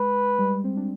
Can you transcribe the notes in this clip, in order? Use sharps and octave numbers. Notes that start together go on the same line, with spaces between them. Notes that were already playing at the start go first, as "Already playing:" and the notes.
Already playing: G#3 B4
G3
C4
D4